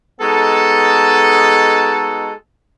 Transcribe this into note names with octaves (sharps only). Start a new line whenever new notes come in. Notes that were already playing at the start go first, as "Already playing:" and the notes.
G#3 B3 D#4 F#4 A4